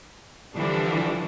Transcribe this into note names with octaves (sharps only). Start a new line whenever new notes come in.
D3 E3 F3 G3 D4